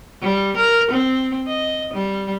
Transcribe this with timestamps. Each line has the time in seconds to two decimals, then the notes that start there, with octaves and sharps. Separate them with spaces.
0.22 G3
0.57 A#4
0.91 C4
1.47 D#5
1.93 G3